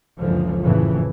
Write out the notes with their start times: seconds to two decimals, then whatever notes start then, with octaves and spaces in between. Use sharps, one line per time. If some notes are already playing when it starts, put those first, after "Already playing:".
0.18 F#1 C#2 G#2 D3 E3 F3
0.63 F#1 F2 A2 C#3 E3